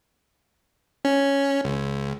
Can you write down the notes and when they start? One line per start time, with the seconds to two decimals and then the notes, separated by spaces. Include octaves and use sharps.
1.05 C#4
1.64 C#2